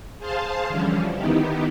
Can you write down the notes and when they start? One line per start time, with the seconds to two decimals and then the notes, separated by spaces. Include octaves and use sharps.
0.19 G#4 C5 F5 A5 C6
0.67 D3 E3 F3 G3 C#4
1.15 D#3 B3 D#4 E4 G4